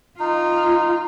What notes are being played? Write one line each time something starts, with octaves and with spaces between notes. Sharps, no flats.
D#4 F4